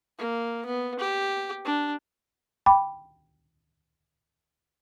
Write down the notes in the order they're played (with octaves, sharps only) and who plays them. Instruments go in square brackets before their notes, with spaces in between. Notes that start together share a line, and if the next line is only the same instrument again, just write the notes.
[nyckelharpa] A#3
B3
G4
D4
[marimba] G5 B5 D6